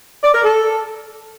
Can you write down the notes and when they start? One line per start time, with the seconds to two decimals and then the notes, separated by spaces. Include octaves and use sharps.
0.23 D5
0.33 A#4
0.43 A4